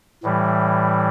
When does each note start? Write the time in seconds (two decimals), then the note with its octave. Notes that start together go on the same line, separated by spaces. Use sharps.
0.23 A2 E3 G3